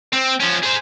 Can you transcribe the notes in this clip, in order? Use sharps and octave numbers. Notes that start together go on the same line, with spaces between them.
C4
F3 C#4
G#4 C5